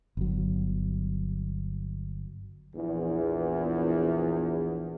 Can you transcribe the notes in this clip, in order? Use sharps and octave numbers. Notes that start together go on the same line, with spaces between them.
G1 F#3
A#1 E2